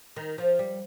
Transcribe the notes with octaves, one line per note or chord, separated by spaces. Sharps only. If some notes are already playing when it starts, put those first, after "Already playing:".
D#3
F3
G3